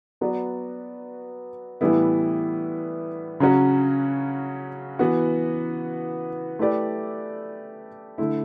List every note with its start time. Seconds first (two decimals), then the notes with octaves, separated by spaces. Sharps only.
0.21 F#3 B3 F#4 B4 D5
1.81 A2 E3 G3 B3 E4
3.40 C#3 F#3 C#4 F#4
4.99 E3 B3 F#4
6.59 A3 E4 G4 B4 D5
8.18 D3 A3 E4